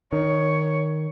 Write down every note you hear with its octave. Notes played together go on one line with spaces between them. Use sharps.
D#3 C#5